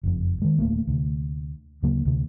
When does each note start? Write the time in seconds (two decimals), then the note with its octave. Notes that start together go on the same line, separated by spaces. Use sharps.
0.03 F#1 F2
0.42 D#3 G#3
0.58 D1 E2 A3 A#3
0.87 D2 C3
1.83 D2 C#3 F#3 A#3
2.05 D2 C3